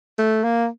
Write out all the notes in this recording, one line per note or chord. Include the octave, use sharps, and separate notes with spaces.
A3
A#3